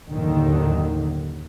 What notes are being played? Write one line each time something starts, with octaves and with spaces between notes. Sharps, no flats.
F#1 D#2 A2 D3 D#3